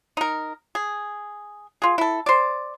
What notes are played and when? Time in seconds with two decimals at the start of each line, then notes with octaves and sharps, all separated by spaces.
0.17 D#4 A#4
0.75 G#4
1.82 F4 G#4
1.98 E4 A4
2.26 C5 D5